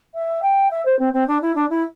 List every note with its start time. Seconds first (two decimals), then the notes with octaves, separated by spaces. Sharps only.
0.15 E5
0.42 G5
0.71 E5
0.86 C5
0.99 C4
1.13 C4
1.28 D4
1.42 E4
1.55 D4
1.70 E4